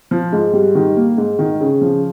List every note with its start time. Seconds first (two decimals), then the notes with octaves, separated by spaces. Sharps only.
0.11 F3
0.32 G#2
0.53 G3
0.75 D#3
0.96 A#3
1.18 G#2
1.39 D#3
1.60 C#3
1.81 F3